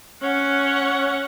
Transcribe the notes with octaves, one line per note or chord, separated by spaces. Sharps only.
C#4 F#5